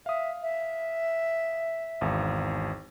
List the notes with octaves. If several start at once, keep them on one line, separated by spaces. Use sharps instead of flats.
E5 F5 D#6
E5
G#1 E2 F5